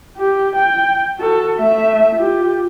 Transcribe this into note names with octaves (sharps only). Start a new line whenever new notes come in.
G4
G5
F#4 A4
A3 E5
F4 G4